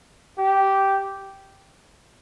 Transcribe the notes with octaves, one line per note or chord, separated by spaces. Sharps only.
G4